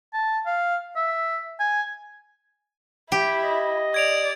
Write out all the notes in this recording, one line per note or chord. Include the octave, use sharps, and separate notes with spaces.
A5
F5
E5
G#5
E4 G4
D#5
D5 G#6 D7 F7